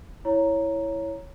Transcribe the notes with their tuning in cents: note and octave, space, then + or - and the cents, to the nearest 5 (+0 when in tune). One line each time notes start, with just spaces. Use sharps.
E4 +0 C#5 +0 A#5 +0